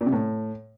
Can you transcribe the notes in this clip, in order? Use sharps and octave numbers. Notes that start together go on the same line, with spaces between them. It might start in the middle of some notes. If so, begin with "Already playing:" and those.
A#2
C3
A2